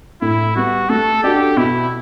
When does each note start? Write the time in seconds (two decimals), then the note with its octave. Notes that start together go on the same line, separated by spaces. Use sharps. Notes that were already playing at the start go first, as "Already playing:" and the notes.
0.22 A2 E4
0.56 G3 B3 F#4
0.89 A3 A4
1.23 D4 F#4 G4 A4
1.57 B2 E4